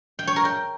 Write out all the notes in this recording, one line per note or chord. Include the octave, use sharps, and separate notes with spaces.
G5
C#5
A#4
G5